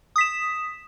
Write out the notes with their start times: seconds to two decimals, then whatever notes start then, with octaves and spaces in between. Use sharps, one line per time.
0.16 D#6
0.18 B6
0.21 E7